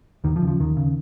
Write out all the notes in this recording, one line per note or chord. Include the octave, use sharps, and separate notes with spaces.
D#2 D#3
F3
C#3
F3
D#2 D#3
C#3